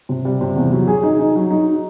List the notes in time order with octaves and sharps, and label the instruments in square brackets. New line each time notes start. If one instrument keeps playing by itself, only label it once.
[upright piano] C3
G3
C3
E2
F#3
G#4
D#4
D#4
F#3
D#4